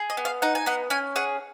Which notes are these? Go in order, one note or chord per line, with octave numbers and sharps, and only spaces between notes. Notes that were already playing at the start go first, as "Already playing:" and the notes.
Already playing: G#4
D#5
B3
F5
D#4 F#5
G#5
B3 F#5
C#4 G#5
G#4 F#5